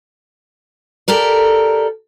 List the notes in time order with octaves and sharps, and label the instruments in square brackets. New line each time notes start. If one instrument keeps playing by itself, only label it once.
[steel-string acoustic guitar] G4 A4 A#4 D5